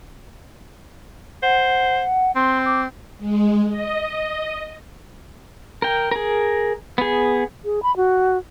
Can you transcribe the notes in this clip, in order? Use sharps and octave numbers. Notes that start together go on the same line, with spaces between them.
C5 F#5
C4 C6
D6
G#3
D#5
A#4 G5
G#4 A#4
B3 G#4
G#4
B5
F#4